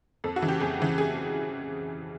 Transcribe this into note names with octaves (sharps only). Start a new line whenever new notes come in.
F2 A4
F#4
C#3 E3
G4
F2 G#4
C#3 E3
G#4